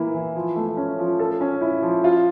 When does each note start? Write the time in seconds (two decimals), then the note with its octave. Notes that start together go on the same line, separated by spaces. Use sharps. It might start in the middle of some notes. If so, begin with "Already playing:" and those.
Already playing: E3 A#3 E4
0.14 E3
0.36 F3
0.56 A3
0.77 C#4
0.99 F3
1.19 A4
1.41 C#4
1.61 E4
1.82 F3
2.04 F4